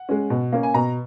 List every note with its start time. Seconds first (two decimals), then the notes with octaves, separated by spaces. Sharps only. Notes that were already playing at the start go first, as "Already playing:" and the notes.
Already playing: F#5
0.09 G#3 C#4
0.30 B2
0.52 A#3 C#4
0.63 G#5
0.74 B2 A#5